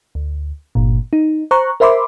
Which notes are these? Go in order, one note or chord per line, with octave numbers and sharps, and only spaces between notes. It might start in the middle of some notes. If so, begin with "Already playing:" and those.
D2
G1 A#2
D#4
C5 A#5 C#6 F#6
A#4 C5 E5 B5 C6 D6